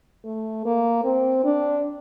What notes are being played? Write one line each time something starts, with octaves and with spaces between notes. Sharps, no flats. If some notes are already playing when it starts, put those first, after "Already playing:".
A3
A#3
C4
D4